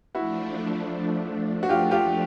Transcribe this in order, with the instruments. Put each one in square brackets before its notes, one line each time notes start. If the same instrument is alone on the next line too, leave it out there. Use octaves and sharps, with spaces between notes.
[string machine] F3 A3 D4 [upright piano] E4 F#4
[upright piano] F#4
F4 G4
F4 G4